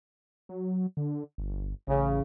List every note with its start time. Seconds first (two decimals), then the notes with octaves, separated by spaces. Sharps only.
0.49 F#3
0.97 D3
1.38 G1
1.88 A1 C#3